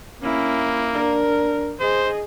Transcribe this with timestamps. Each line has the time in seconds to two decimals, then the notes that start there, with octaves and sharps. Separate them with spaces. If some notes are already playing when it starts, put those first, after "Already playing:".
0.22 A#3 C#4 E4
0.94 D4 A#4
1.80 G#4 C5 D#5